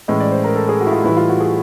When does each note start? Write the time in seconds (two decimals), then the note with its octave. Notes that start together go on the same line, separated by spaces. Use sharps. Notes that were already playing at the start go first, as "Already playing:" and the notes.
0.08 A2 E3 G#3 C#4 D#5
0.20 D5
0.32 C5
0.44 A#4
0.56 A4
0.69 G#4
0.81 F#4
0.86 E4
0.92 F4
1.04 A2 E3 G3 E4
1.17 F4
1.29 F#4
1.40 G#4